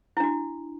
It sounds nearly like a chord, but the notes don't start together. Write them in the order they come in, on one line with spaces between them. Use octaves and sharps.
E4 D4 F#4